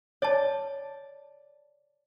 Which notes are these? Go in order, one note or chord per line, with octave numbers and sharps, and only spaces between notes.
C#5 D5 A5